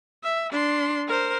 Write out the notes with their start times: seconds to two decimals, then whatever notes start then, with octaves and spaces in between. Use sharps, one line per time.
0.23 E5
0.52 D4 C6
1.08 A#4 C5